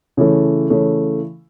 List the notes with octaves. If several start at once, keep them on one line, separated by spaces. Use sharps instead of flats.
C#3 E3 A3
C#3 E3 A3